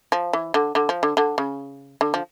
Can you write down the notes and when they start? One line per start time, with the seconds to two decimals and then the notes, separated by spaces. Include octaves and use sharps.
0.12 F3
0.33 E3
0.54 D3
0.75 D3
0.89 F3
1.03 D3
1.17 D3
1.38 C#3
2.01 D3
2.14 F3